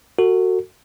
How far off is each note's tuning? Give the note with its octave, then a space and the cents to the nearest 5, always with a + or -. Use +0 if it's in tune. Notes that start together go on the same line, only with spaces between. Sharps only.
F#4 +0 A4 +40